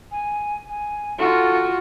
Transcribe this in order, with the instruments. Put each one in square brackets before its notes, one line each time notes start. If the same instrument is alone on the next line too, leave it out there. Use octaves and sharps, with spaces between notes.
[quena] G#5
G#5
[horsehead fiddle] F4 F#4 [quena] A4